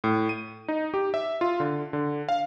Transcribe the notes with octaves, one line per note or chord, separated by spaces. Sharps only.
A2
D#7
D#4
G4
E5
F4
D3
D3
F5